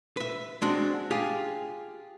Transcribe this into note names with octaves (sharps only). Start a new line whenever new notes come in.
B4 E5
G#3 C4 D4 F#4
F4 G4 G#4